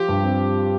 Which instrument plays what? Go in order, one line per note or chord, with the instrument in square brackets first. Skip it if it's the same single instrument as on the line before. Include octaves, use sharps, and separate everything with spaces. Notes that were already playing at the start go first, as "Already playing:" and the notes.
Already playing: [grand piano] F3 F4 [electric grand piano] G4
[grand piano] G2
C4